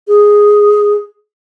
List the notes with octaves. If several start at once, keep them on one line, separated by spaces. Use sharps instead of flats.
G#4